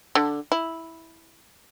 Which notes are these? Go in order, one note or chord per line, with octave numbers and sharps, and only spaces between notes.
D3
E4